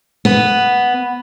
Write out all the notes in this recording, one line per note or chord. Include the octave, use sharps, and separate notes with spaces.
B3